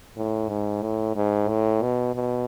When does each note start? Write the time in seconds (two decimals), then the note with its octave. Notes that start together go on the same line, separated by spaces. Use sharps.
0.16 A2
0.49 G#2
0.82 A2
1.16 G#2
1.48 A2
1.82 B2
2.15 B2